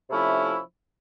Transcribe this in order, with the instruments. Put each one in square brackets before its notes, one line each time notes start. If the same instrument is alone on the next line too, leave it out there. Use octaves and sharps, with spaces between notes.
[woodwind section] C3 F3 A3 C#4 E4